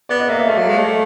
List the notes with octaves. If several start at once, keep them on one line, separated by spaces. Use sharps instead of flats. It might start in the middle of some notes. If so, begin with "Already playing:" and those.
B3 D5
D#5
A#3 E5
E5
A3 F5
F#3
G#3
A3